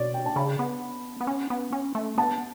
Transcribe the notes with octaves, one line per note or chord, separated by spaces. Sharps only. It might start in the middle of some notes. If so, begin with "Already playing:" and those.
Already playing: B2 C#5 D5
G5
A5
C#3 B5
B3
B3
C#4
B3
C#4
A3
B3 A5